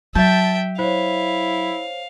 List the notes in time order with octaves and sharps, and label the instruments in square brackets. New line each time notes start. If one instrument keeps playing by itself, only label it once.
[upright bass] F#3 [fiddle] E5 G5 [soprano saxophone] A5 [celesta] G6 A6
[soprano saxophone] E4 [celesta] C5 C#5 [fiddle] F5